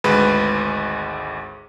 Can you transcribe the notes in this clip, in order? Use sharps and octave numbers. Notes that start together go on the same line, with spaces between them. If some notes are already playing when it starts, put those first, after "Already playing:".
G#1 D2 G#3 B4